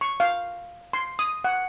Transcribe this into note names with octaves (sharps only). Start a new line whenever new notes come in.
C#6
F5
C6
D#6
F#5